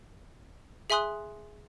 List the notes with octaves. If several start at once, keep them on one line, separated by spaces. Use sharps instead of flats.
G#4 E5 G#5 C6 D#6 F#6